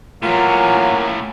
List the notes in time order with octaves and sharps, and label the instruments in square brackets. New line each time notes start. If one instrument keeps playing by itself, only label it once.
[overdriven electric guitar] A2 C#4 [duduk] F#3 [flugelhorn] A#3 [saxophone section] F4